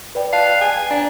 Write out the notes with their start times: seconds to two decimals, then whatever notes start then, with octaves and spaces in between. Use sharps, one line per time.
0.15 B4 D5 G5
0.33 F5 A5 F#6
0.61 G#5
0.91 D4 A#5